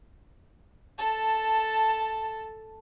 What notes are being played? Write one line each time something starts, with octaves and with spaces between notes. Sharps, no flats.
A4 A5